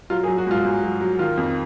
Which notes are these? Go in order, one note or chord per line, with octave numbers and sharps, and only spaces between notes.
F#3 F4
G#4
F#3
F#4
G#2 F4
G#2
F#3
F#3
D#3 F4
F2